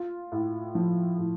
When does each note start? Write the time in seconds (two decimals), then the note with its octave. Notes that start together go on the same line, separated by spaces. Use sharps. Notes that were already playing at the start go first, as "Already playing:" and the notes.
Already playing: F4
0.32 A2
0.75 F3
1.18 A2